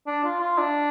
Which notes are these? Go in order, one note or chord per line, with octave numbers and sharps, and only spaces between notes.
D4
F4
F4
D4